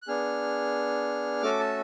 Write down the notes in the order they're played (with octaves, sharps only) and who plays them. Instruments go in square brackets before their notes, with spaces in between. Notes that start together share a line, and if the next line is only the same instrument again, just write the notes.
[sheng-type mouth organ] F#6
B3 D4 G#4 F6
A3 C#4 F#4 A4 D6
A5